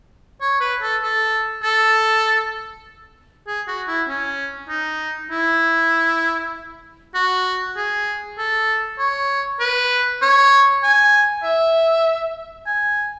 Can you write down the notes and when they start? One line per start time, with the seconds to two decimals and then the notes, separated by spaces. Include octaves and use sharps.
0.41 C#5
0.61 B4
0.82 A4
1.02 A4
1.63 A4
3.47 G#4
3.68 F#4
3.88 E4
4.08 C#4
4.69 D#4
5.31 E4
7.15 F#4
7.77 G#4
8.38 A4
8.98 C#5
9.60 B4
10.22 C#5
10.83 G#5
11.43 E5
12.66 G#5